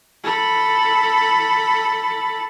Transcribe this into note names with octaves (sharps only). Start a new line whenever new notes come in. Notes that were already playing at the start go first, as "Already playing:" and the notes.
A4 B5